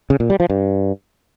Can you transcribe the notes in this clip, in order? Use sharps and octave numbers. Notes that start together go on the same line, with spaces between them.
C#3
A#2
G3
F3
G2